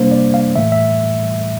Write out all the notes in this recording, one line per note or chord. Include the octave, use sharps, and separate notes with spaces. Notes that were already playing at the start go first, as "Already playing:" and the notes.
Already playing: C3 G3 A#3 D4 C5
D5
F5
A2 E3 A3 E5
E5